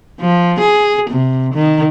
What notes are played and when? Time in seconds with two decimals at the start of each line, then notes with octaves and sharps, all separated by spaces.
0.20 F3
0.60 G#4
1.10 C3
1.54 D#3